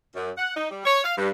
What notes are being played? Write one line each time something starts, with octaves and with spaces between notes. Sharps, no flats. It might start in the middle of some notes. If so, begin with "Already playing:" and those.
F#2
F#5
D#4
G3
C#5
F5
G2